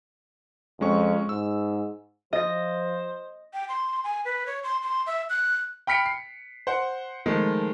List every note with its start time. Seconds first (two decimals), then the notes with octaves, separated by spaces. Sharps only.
0.81 F2 G#3 C#4 C#6
1.29 G#2 E6
2.33 F3 C5 D#5 A#6
3.54 G5
3.69 C6
4.04 G#5
4.25 B4
4.47 C#5
4.64 C6
4.83 C6
5.07 E5
5.30 F#6
5.87 G5 B5 F6 B6 C#7 D7
6.06 C7
6.67 C5 F#5
7.26 D#3 F3 G#3 A3